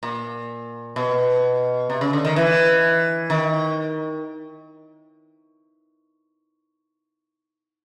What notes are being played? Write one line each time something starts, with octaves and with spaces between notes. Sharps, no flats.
A#2
B2
C3
C#3
D3
D#3
E3
D#3